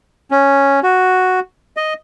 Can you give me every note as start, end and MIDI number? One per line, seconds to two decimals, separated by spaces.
0.31 0.80 61
0.83 1.40 66
1.77 1.94 75